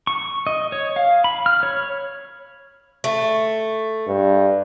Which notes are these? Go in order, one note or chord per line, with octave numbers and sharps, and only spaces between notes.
C#6
D#5
C#5
F5
B5
F6
C#5
A3
G2